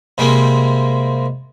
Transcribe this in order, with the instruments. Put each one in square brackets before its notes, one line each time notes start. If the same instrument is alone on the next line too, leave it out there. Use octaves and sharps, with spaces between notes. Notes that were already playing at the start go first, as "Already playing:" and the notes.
[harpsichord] C3 G3 G#3 A#3